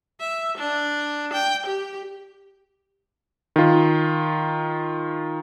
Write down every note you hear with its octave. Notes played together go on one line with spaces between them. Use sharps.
E5
D4
G5
G4
D#3 F4